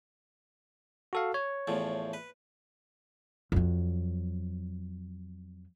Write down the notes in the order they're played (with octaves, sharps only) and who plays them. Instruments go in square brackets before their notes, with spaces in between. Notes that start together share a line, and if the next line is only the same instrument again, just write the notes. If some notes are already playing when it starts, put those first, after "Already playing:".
[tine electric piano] F#4 A4 F5
C#5
[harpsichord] E2 A2 F3
B4
[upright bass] F2 F#3